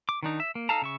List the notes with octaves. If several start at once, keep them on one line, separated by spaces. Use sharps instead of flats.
D6
D#3 D4 D#4
E5
A#3
D#4 A4 F5 A5 A#5
C#3 E5 C#6